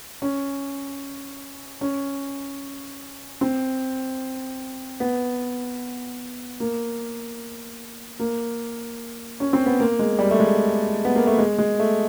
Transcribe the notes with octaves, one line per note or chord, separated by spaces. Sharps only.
C#4
C#4
C4
B3
A#3
A#3
C#4
C4
B3
A#3
G#3
G3
A3
G#3
B3
A#3
A3
G#3
G#3
A3